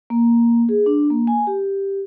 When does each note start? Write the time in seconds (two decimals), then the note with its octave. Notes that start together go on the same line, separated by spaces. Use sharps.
0.10 A#3
0.69 G#4
0.86 D4
1.10 A#3
1.27 G#5
1.47 G4